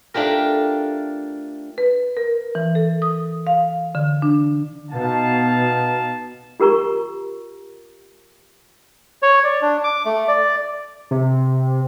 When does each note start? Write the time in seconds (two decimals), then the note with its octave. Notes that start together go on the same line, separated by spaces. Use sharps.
0.14 A3 D4 F4 G4 A#4
1.78 B4
2.17 A#4
2.55 E3
2.75 A4
3.02 D#6
3.47 F5
3.95 D3
4.22 D4
4.90 B2 D#4 F5 A5
6.60 F4 G4 A#4 A#5 C#6
9.22 C#5
9.44 D5
9.62 D4
9.84 D6
10.05 A3
10.28 D5
11.11 C3